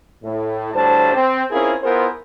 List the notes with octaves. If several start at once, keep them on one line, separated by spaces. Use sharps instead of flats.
A2
D2 A2 G3 D4 C5 A5
C4
C4 C#4 E4 F4 G#4 A#4
B3 E4 F4 G#4 A#4 C5